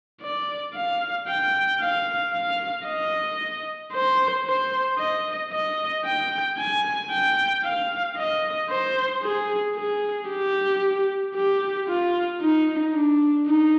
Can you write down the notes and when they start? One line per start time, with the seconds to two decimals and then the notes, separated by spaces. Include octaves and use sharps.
0.21 D5
0.75 F5
1.28 G5
1.81 F5
2.34 F5
2.87 D#5
3.93 C5
4.46 C5
4.99 D#5
5.52 D#5
6.05 G5
6.58 G#5
7.11 G5
7.64 F5
8.17 D#5
8.70 C5
9.23 G#4
9.76 G#4
10.29 G4
11.35 G4
11.88 F4
12.42 D#4
12.94 D4
13.47 D#4